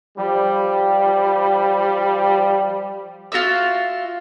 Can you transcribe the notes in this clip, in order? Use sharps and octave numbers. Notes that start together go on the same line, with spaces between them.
F3 G3
F4 F#4 E5 E6